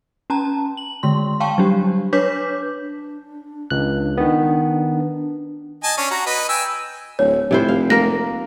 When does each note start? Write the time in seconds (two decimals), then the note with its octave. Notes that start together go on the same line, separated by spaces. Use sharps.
0.30 C#4 A5 A#5
0.77 F#7
1.03 D3 G#3 C6
1.40 F5 G5 A5 C#6
1.58 F#3 G3 D4 G4
2.13 D4 B4 C#5 D6 G6 B6
2.80 D4
3.70 C#2 F#6
4.17 D#3 B3
5.84 D#5 G#5 A5
5.98 C#4 D4 C#5
6.11 F#4 A#5
6.26 B4 D#5
6.49 G5 G#5 E6
7.19 D1 C#5
7.51 F1 C3 E4 C5
7.68 F5
7.90 A#3 A#4 A#6